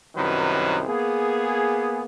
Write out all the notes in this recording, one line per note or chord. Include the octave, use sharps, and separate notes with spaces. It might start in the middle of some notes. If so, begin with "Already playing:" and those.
C2 F#2 D#3 F#3 B4
A#3 B3 G#4